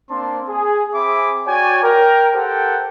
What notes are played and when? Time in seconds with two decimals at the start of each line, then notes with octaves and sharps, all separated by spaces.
0.10 A#3 C4 D4 A5 C6
0.49 G#4
0.94 C4 G#4 E5 G#5 B5 D6
1.47 F#4 C#5 D5 G5 G#5
1.84 A#4 G5
2.35 G4 A4 A#4 C5 F#5 G5